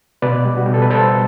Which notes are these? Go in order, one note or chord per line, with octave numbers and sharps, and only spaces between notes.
B2 B4 D5
G3
F#4
B2 G4
A4
B4
G3 A4 C5